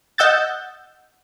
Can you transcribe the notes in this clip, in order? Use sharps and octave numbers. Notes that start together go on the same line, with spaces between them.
D#5 F#5 E6 G6 A6